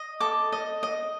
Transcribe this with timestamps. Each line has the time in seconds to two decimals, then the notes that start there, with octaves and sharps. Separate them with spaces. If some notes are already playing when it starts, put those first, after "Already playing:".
Already playing: D#5
0.20 A4 D6
0.52 D#5
0.83 D#5